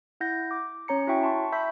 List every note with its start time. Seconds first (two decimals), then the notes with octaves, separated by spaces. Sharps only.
0.21 E4 F#5 G6 A#6
0.51 D6
0.88 C#4 C#5 A#5 C#7
1.07 E4 F#4 C#5 E5 G5 C#6
1.23 A5 C6 C#6
1.52 E5 B5 C#6 E6 G6 B6